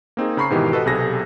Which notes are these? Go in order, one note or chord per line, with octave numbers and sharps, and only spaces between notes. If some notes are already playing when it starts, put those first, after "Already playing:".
A#3 C4 D#4 G#4
C#3 A#5 B5 C#6 C7
G#2 B2 D#3 E3 G4
F#4 A4 B4 D#5
B1 C3 G#4 A4 A#6